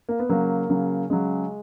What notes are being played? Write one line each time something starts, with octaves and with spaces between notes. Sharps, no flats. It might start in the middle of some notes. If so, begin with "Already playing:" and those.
A#3
B3
C#3 F#3 A#3
C#3 F#3
C#3 F#3 G#3